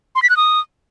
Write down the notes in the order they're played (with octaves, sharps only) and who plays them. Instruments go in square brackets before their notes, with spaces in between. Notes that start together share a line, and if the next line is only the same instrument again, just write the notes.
[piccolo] C6
B6
F#6
D#6